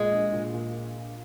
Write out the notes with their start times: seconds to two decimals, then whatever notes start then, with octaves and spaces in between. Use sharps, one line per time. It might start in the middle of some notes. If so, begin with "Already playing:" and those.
Already playing: A#2 G#3
0.11 A#1
0.33 A#2
0.54 A#2